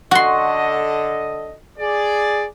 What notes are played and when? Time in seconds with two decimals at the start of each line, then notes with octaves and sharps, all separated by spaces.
0.11 D3 F#4 A4 D#5 C6
1.79 G#4 D5